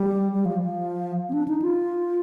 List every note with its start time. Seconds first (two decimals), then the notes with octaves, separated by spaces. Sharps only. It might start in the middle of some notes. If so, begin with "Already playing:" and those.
Already playing: G3
0.34 G3
0.45 F3
0.60 F3
1.29 C4
1.33 D4
1.48 D#4
1.62 F4